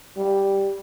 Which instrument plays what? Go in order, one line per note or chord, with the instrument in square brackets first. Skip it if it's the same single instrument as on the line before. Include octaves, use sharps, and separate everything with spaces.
[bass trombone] G3